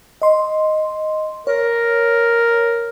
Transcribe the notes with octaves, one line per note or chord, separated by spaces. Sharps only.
D#5 C6
A#4 C#5